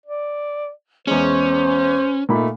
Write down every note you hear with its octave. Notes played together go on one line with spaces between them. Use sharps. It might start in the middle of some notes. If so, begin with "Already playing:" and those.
D5
E2 G#3 C#4 C5
A#2 A3 D#4 B5